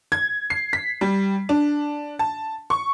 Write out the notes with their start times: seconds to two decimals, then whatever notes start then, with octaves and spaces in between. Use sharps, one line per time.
0.12 G#6
0.50 C7
0.73 B6
1.01 G3
1.49 D4
2.19 A5
2.70 C#6